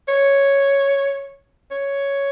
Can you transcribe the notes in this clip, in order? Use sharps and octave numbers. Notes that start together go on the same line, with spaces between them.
C#5
C#5